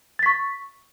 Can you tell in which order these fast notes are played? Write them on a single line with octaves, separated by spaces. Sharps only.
A6 B6 C#6